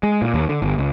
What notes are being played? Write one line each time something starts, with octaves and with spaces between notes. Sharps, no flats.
G#3
A#2
D#2
D3
G1
C#2